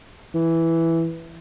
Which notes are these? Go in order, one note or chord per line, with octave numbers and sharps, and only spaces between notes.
E3